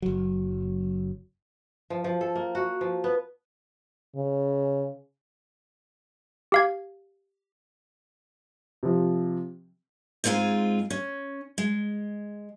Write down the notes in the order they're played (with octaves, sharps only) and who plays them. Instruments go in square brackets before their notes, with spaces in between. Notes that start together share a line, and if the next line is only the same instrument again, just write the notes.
[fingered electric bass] F#1 F#3
[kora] F3
F3
A4
A#3
F#4
F3
B3
[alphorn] C#3
[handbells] G4 F5 G#6
[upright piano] C3 F3
[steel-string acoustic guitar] G#2 G#3 C4 F4 G#5
C#4
G#3